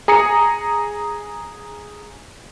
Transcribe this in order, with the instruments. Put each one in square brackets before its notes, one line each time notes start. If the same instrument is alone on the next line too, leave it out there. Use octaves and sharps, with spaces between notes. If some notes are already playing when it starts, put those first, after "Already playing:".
[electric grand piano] G#4 A#5 D#6 C#7